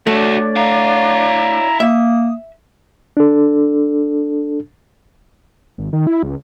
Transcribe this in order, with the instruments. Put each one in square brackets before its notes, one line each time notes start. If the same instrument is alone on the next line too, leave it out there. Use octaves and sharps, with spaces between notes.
[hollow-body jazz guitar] A3 [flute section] D4 C#5 D5 [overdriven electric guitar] F#4 A4
[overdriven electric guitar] E4 F5 [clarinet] A#5
[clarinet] A#3 [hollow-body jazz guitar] E5 [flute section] D#6
[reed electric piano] D4 A4
[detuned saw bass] G#1
D#3
E4
C#2